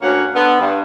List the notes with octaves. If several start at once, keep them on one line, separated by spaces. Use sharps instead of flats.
D2 A#3 C#4 C#5 F#5
D3 B3
G2